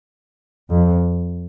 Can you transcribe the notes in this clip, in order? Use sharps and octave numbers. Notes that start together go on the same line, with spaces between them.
F2